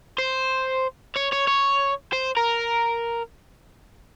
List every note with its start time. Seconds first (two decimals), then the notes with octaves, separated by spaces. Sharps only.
0.18 C5
1.16 C#5
1.32 C#5
1.47 C#5
2.13 C5
2.37 A#4